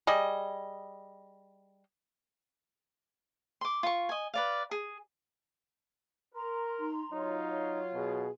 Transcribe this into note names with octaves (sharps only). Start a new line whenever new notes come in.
G3 G#4 D#5
C6 D6
F4 C#6
D#5 G#5
B4 D5 F5
G#4
A#4 A#5 C6
D#4
F#3 D#4 F4 C#5
C#5
B2 G#4